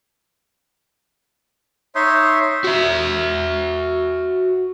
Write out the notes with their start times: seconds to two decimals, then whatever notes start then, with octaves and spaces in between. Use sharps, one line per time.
1.95 D#4 C#5 E5 C6
2.64 F#4 E5